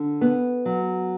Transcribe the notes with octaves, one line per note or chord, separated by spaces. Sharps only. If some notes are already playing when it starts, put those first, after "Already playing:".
Already playing: D3
B3
F#3